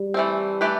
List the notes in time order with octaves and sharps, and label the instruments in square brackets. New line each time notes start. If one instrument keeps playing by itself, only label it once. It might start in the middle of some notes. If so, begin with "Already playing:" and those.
Already playing: [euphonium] G3
[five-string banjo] E3 A3 C4
E3 A3 D4 G4 B4